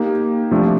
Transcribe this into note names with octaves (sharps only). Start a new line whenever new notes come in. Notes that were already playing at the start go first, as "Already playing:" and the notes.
Already playing: A#3 D#4 G4
C3 F3 A3 D4